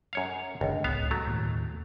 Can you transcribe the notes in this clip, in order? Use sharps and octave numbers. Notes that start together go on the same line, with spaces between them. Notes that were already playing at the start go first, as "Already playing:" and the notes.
F#2 C#5 F5
F#1 C#2 D3
D1 C#2 B3 F5
F#3 A3
D#2 A2